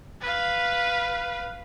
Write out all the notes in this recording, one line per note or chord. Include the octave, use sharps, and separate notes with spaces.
B4 F5